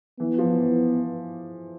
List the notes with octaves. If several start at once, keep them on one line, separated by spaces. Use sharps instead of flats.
E3 B3
F3
E3